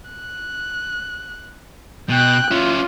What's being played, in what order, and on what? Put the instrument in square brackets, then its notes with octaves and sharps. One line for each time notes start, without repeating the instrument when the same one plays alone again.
[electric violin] F#6
[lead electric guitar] B2 [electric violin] G5 F#6
[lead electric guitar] C#4 E4 [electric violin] F4